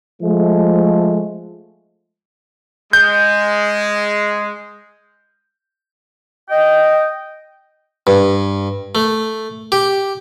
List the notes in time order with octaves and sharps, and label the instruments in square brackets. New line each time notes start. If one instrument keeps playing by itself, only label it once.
[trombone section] F3 G#3 A3
[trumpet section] G#3 [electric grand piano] G6
[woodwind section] D#5 G5
[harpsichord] G2
A3
G4